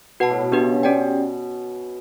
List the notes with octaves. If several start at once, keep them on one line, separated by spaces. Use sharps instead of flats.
B2 F#4 B4 F#5 A5
A2
B2
B2 B3 D4 G4 B4
C#3
B2
C#4 G4 D5 G5